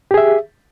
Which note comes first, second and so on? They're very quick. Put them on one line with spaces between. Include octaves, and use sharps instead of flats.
G4 G#4 E5